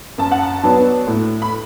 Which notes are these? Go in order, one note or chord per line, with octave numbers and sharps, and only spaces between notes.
F#2 A5
F#5
A5
F#3 B3 D4
A2
B5